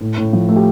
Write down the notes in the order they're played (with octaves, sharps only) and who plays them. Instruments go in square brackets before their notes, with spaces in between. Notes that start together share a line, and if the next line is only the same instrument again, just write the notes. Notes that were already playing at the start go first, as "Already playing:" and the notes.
[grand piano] A2
A2
F3
A3
G4